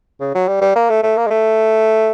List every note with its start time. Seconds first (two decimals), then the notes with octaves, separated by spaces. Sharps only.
0.21 C#3
0.35 F#3
0.48 G3
0.61 G3
0.76 A#3
0.90 A3
1.03 A3
1.17 A#3
1.27 G#3
1.30 A3